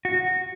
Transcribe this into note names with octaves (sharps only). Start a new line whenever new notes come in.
F#4